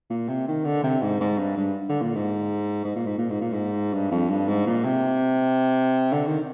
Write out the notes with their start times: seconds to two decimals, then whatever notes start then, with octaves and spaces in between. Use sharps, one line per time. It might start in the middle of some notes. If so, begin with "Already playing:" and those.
0.10 A#2
0.29 C3
0.48 D#3
0.65 D3
0.84 C3
1.02 G#2
1.21 G#2
1.38 G2
1.57 G2
1.89 D3
2.02 A#2
2.15 G#2
2.84 G#2
2.96 A#2
3.07 G#2
3.18 A#2
3.30 G#2
3.41 A#2
3.53 G#2
3.93 G2
4.11 F2
4.30 G2
4.48 G#2
4.66 A#2
4.85 C3
6.12 D3
6.27 D#3